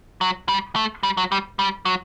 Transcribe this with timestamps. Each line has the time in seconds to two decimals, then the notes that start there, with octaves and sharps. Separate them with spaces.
0.21 F#3
0.49 G3
0.76 A3
1.03 G3
1.17 F#3
1.32 G3
1.59 G3
1.85 F#3